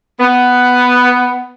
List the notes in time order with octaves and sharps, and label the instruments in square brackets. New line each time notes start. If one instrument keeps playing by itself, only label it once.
[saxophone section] B3